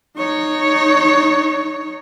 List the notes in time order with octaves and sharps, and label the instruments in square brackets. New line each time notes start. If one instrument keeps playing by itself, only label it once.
[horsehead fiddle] D#4 C#5